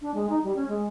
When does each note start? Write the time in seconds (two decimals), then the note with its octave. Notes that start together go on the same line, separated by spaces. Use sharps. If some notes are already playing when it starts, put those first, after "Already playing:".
0.01 D4
0.14 G#3
0.29 D#4
0.44 G3
0.56 C#4
0.69 G#3